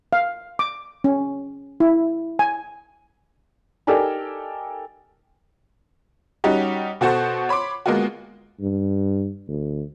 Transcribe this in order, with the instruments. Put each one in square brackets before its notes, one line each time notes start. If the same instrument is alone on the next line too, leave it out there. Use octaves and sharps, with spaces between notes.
[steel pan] F5
D6
C#4
E4
G#5
[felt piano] D#4 G4 A4 A#4 D5 G#5
[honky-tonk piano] G3 C#4 D#4 F#4 G4
B2 F#4 A4 C5 F#5 C#6
C#5 B5 C6 D6
G#3 A#3 B3 F4 F#4
[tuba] G2
D2